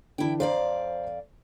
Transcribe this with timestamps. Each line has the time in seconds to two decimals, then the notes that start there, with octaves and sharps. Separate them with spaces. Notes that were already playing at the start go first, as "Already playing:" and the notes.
0.18 D3 E3 D4 E4 G5
0.40 F2 C5 D5 F5 A#5